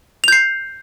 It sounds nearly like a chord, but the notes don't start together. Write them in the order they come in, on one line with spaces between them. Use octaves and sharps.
F7 G6 C7